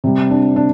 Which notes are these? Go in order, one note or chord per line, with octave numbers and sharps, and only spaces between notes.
C3 G3
D4
D4